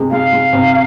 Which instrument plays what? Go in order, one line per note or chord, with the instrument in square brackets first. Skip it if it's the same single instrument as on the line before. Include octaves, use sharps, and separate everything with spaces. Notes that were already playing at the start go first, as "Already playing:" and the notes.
Already playing: [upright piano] C3 G#3
[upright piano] G#3 [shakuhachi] F5
[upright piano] G#3
C3